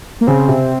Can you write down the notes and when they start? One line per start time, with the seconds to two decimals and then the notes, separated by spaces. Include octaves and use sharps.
0.21 A#3
0.27 C#3 C4
0.48 C3